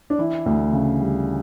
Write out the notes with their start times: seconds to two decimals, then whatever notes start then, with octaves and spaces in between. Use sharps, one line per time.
0.10 D4
0.18 E3 E4
0.46 D2
0.73 C#3
1.00 G3